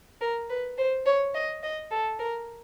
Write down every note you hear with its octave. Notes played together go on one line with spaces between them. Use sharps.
A#4
B4
C5
C#5
D#5
D#5
A4
A#4